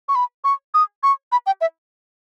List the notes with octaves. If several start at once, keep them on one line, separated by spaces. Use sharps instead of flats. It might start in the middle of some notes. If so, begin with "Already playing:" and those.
C#6
B5
C#6
D#6
C#6
B5
G5
E5